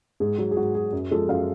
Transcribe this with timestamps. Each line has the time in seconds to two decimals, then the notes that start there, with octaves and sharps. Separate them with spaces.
0.20 G#2 G#4
0.38 F#3 G#4
0.51 G#4
0.57 G#2 F#4
0.75 F#3 G#4
0.92 F#2
1.11 F3 G#3 A4
1.29 F#2 F5